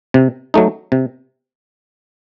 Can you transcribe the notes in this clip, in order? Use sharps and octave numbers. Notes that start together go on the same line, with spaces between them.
C3
F#3 A3 D#4
C3